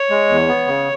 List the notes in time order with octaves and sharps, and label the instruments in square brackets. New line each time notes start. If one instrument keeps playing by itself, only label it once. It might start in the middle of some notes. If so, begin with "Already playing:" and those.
Already playing: [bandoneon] C#5
G#3
E2
B3
C#3